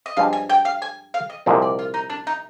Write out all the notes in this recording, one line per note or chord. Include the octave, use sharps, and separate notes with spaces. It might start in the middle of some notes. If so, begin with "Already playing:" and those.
D#5
G2 F3 G#3 D4 F5
G#5
G5
F5
G#5
F5
D#5
C2 A#2 F3 G#3 C4
D5
F4
D#4
D4
D#4